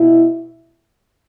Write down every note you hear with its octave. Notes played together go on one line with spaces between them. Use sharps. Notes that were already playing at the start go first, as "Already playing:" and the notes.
Already playing: B2 E4